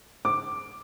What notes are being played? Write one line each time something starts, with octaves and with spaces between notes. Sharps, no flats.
D6